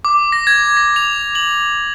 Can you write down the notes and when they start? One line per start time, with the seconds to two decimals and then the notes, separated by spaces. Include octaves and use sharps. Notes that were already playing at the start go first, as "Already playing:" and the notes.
0.05 D6
0.32 A#6
0.47 G#6
0.77 A#6
0.96 F7
1.35 F#7